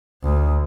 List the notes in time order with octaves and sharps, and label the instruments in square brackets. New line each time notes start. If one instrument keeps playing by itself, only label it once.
[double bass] D2